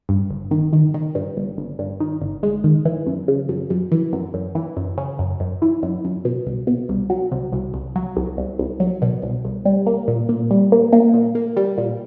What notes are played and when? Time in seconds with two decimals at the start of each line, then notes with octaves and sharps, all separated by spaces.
0.09 G2
0.30 G1
0.51 D#3
0.73 D#3
0.94 D#3
1.15 G2
1.37 G1
1.58 G1
1.79 G2
2.00 D#3
2.21 G1
2.43 G#3
2.64 D#3
2.85 E3
3.06 F#2
3.28 C#3
3.49 F#2
3.70 F#2
3.92 E3
4.13 F#2
4.34 F#2
4.55 E3
4.77 F#2
4.98 C#3
5.19 F#2
5.40 F#2
5.62 E3
5.83 F#2
6.05 F#2
6.25 B2
6.46 C2
6.67 B2
6.89 C2
7.10 F#3
7.32 C2
7.53 C2
7.74 C2
7.96 F#3
8.16 C2
8.37 C2
8.59 C2
8.80 F#3
9.02 B2
9.23 C2
9.45 C2
9.65 G3
9.86 A#3
10.08 A#2
10.29 A#2
10.51 G3
10.72 A#3
10.93 A#3
11.14 A#2
11.35 A#3
11.57 G3
11.78 A#2